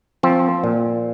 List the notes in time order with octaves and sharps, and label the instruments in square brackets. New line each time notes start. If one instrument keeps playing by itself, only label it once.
[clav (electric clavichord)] F3 C4
A#2